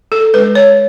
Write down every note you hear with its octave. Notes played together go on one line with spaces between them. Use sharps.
A4
G#3 D4 B4
C#5